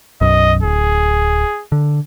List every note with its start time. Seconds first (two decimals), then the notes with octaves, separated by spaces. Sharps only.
0.21 B1 F#2 D#5
0.63 D1 G#4
1.72 D3